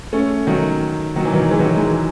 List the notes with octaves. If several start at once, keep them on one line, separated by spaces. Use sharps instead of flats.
A3 C#4
D#3 F#3
D#3 F#3
E3
D#3 F#3
E3 G#3
D#3 F#3
E3 G#3